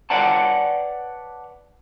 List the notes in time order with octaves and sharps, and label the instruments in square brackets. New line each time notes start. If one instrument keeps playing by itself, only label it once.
[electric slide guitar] B4 C#5 D5 F#5 G5 A5